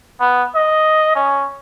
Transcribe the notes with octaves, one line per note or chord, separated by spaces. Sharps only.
B3
D#5
C#4